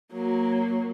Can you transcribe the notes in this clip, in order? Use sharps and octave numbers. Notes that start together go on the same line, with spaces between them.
F#3 A#3